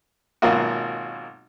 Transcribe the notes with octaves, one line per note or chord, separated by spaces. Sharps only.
G#1 B2 F#3 A#3 F4 F#4